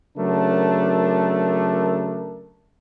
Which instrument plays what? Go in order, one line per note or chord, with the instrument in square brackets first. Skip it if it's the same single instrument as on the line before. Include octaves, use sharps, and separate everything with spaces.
[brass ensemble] C#3 F#3 A3 D4 A#4